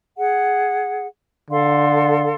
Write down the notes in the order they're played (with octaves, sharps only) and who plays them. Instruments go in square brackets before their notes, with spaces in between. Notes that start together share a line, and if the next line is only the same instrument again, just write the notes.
[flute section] G#4 F#5
[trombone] D3 [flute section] A4 F5 C6